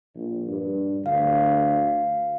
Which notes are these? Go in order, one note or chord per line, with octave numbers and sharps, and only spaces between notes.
A#1
G2
D2 F5